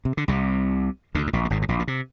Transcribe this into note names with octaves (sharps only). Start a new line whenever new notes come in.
C3
D3
C2 C3
D2 D3
G#2
A#1 A#2
A#2
G#1 G#2
G#2
A#1 A#2
A#2
C3